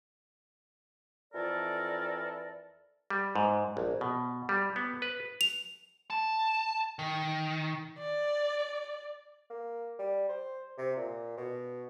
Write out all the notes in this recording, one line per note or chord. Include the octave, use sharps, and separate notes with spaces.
F2 E3 A4 A#4 D5
G3
G#2
A#1
B2
G3
B3
B4
F7
A5
D#3
D5
A#3
G3
C5
C3
A#2
B2